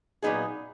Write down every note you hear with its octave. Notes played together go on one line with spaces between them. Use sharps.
A#2 F#3 B3 D#4 G#4